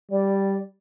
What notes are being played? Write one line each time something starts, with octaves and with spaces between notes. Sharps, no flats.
G3 D5